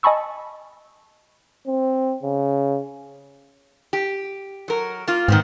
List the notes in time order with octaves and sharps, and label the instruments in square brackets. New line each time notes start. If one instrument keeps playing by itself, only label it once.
[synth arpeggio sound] D#5 G#5 A5 B5 C#6 E6
[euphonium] C4
C#3
[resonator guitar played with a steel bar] G4
F#3 A#4
A#3 F4
[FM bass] G#2 [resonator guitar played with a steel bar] D#3 B3 C4